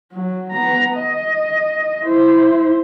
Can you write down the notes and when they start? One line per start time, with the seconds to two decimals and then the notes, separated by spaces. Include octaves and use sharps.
0.12 F#3
0.52 B3 A#5
0.96 D#5
2.03 E4 C5